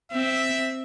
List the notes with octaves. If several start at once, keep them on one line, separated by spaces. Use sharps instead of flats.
C4 E5